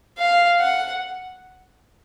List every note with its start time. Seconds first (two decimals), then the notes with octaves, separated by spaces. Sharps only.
0.18 F5
0.60 F#5